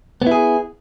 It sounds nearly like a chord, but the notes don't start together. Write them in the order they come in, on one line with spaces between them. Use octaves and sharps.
B3 E4 G#4